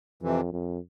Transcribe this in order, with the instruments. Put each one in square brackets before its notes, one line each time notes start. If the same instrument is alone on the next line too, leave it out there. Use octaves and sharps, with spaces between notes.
[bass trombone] F2 [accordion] C3 E3
[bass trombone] F2